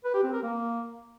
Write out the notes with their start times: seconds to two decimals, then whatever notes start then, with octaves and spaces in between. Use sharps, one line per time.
0.05 B4
0.14 G4
0.24 C4
0.33 A#4
0.43 A#3